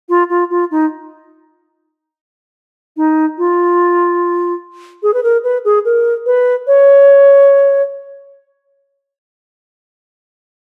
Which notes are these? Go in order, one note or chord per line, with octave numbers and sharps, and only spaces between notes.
F4
F4
F4
D#4
D#4
F4
G#4
B4
A#4
B4
G#4
A#4
B4
C#5